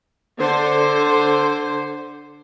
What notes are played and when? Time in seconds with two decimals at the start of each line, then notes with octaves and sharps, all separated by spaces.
0.40 D3 C5